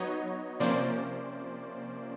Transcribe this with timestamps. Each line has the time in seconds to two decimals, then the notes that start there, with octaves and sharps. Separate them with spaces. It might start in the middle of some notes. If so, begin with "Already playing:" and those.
Already playing: F#3 B3 D#4 C#5 D#5
0.60 C3 F3 A#3 C#4 C5 D5